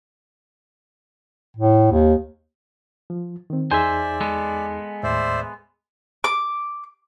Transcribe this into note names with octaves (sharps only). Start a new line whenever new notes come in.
A2
D#2
F3
D#3 C4
E2 D#4 G#4 C5 D5 E5 G#5
G#3 B3 A4
D#2 A2 C5 D5 E5
D6